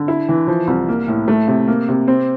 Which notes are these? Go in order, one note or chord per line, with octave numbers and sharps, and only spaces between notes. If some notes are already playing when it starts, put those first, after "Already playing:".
Already playing: D3
E4
E3
F3
C2
A#3
A2
A3
C3
A#3
C3
C4